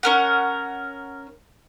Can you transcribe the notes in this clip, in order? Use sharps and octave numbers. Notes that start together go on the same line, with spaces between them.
C#4 A#4 F#5